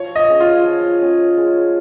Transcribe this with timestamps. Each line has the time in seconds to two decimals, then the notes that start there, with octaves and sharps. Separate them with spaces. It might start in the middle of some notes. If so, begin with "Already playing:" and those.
Already playing: F3 C#5
0.15 D#5
0.29 C#4 G#4
0.40 F4
0.65 F3
1.01 C#4 G#4
1.37 G#3